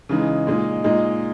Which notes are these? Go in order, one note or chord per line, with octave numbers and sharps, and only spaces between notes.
C#3 E3 G#3 D#4
A#2 G#3 D#4
A#2 G#3 D#4